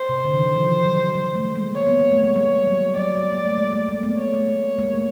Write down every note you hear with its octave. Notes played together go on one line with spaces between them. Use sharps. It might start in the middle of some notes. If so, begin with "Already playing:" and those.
Already playing: C5
C3
D3
E3
D#3
F3
F#3
G3
A3
G#3 A#3
C#5
B3
A#3
A3
G#3
G3 C#5
F#3
F#3 D5
G3
A#3
A3
G#3
A3
G#3 A#3
A3 B3
C#5
A3
A3
G#3 A#3
A3